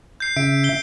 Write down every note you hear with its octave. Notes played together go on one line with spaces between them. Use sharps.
G6 C7
C#3 E5 D7
G6 G7